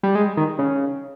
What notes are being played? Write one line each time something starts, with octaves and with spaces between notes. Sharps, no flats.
G3
G#3
D#3
C#3